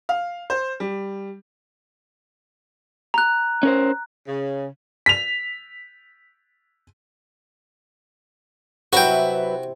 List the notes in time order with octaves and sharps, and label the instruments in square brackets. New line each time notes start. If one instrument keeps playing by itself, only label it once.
[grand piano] F5
C5
G3
[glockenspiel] A#5 F#6
[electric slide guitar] C#4 A#4 C5
[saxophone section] C#3
[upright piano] B6 F7
[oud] C3 E4 [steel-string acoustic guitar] F#3 B4 E5 [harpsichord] F#4 G5